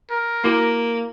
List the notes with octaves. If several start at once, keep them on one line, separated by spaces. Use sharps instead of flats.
A#4
A#3 E4 F#4